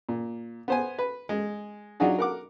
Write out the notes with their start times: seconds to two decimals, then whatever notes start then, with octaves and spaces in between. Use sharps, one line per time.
0.09 A#2
0.68 B3 C5 G#5
0.99 B4
1.29 G#3
2.00 F#3 D4 D#4 F4 F#4 G#4
2.18 A#4 F#5 D6